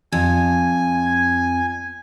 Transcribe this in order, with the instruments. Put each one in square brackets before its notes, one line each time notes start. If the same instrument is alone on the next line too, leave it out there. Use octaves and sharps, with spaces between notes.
[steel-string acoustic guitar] F2 [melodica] G#5